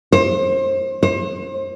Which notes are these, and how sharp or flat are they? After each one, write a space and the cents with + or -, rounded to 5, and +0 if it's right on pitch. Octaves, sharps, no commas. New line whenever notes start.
C5 +35
C5 +40